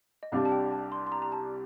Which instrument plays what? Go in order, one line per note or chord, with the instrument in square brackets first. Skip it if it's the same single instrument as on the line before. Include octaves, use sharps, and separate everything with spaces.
[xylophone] D#5
[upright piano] C2 C3 G3 D4 [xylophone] F5
[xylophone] A5
G5
A5
C6
C6
A#5
A#5
A5